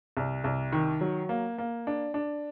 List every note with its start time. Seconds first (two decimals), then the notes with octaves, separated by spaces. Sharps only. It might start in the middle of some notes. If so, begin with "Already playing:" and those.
0.17 C2
0.44 C2
0.72 D#3
1.01 F#3
1.29 A#3
1.58 A#3
1.87 D4
2.14 D4